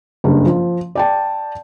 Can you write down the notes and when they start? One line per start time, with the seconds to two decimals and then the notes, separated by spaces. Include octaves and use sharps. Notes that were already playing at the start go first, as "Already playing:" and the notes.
0.24 F#1 G2
0.46 F3
0.95 D5 G5 A5